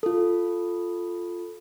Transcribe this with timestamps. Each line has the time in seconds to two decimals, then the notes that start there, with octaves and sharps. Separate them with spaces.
0.03 F4 A4